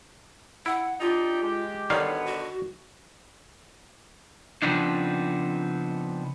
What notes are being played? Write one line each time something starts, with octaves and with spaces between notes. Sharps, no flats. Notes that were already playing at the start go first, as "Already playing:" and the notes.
E4 F#5
D4 D#4 F4 G4
G#3 G4
B2 D3 D#3 G3 B3 C#5 F5
F#4
C#3 F3 B3 C4 D4 D#4